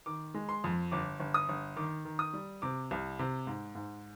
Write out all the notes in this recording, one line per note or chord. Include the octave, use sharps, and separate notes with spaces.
D#3 D6
G#3
C6
F2
G1 D6
G1
D#6
G1
D#3 D6
D#3
D#6
G3
C3 D6
C2
C3
G#2
G#2